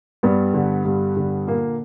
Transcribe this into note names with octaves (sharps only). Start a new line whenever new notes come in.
G2 G3 B3
D3
G2
D3
A#2 A#3